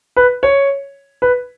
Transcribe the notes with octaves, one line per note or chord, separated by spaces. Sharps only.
B4
C#5
B4